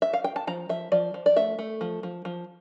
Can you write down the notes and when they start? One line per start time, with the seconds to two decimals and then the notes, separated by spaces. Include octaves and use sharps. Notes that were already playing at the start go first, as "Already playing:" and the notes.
0.02 E5
0.14 F5
0.24 G5
0.36 A5
0.47 F3 A#5
0.69 F3 E5
0.92 F3 D5
1.14 F3
1.26 D5
1.36 A3 E5
1.59 A3
1.81 F3
2.03 F3
2.25 F3